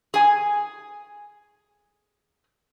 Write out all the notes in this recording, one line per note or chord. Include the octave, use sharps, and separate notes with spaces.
G#4 G#5